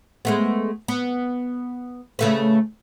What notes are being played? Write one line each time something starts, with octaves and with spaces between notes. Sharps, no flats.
G#3 A3 B3
B3
C#3 A3 B4